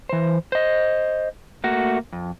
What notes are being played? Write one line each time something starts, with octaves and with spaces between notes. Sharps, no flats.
E3 C5
C5 D#5
A3 A#3 F#4
F2